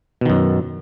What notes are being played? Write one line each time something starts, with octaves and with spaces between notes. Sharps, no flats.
F#2 B2 D#3